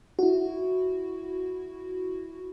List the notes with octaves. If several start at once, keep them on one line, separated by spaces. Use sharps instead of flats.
E4 F#4